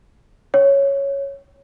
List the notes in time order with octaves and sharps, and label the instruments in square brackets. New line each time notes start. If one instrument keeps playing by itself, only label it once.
[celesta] C#5